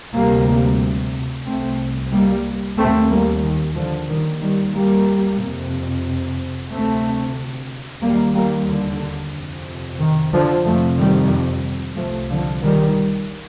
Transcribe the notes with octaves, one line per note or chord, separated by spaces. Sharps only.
D2 C3 G3 A#3
C2 C3 A3 C4
G3 A#3
D#2 A3 C4
G3 A#3
D#3
D3 F3
D#2 D#3 G3
D#3 G3
G3 A#3
F2 C3
D2 C3 A3 C4
D#2 G3 A#3
G3 A#3
D3
F2 C3
D#3
D3 F3
F2 F3 A3
C3
D#3 G3
C2 C3 F3 A3
D3 F3
D#3 G3